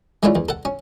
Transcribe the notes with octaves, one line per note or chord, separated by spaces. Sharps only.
G#3 A3 C#4 D4 E4 F4
E2
A4 F#5
C#4